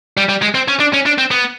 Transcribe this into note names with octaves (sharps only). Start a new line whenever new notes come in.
G3
G3
G#3
C4
C#4
D4
C#4
D4
C4
B3